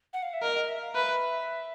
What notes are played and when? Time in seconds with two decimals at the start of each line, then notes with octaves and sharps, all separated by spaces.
0.13 F#5
0.23 F5
0.33 E5
0.42 A#4 D#5
0.55 D#5
0.69 E5
0.81 F5
0.94 B4 E5